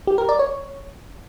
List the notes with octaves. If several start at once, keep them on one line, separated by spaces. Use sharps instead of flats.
G4
A#4
D5
C#5